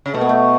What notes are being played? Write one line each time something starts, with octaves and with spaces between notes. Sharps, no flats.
C#3
B2 A3
B3
A3